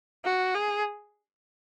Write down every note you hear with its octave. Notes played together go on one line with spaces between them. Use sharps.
F#4
G#4